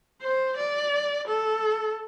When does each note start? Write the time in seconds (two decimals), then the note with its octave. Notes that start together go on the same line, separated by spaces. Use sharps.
0.22 C5
0.57 D5
1.28 A4